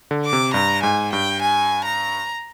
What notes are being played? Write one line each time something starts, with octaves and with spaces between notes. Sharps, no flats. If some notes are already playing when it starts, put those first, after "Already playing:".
D3
D6
C3
G2 A#5
G#2 G#5
G2 G5
G#5
A#5